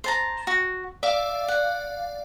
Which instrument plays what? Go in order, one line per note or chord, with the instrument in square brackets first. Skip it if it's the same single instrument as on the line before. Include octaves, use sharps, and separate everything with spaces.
[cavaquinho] C5 A5 A#5
F#4
[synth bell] D5 F5 [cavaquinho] E5
[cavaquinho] F#5